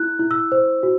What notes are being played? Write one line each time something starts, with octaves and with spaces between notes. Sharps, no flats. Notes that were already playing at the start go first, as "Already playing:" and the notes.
Already playing: E4 F#6
E4
E6
C5
F#4